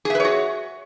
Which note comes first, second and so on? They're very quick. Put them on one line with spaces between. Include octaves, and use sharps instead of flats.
G#4 E5 B4 C#5 F#4